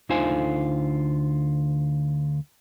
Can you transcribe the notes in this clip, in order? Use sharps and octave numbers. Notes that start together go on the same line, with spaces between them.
D2 D3 D#4 F4 C5 G#5